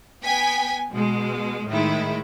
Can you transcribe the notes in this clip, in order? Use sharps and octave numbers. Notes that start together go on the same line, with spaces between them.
B3 G5 G#5 B6
B2 G#3
A2 D#3 G#3 E4